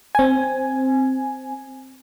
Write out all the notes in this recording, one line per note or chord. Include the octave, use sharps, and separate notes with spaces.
C4 G#5